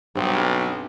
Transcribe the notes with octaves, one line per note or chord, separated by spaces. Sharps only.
B1 G2 C4